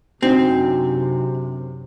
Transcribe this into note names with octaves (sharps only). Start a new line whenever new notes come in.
F#2 C3 C4 D4 D#4 F#4